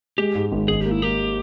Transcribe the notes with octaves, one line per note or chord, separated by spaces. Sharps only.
G#3 G4
G#2
G#1
G#1 G#4
A#3 G4
E4
A#3 G4